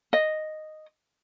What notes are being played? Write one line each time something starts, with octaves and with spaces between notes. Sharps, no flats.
D#5